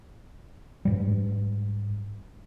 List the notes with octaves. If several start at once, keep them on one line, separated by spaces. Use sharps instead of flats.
G#2 G3